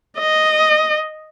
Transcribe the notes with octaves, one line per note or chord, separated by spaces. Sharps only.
D#5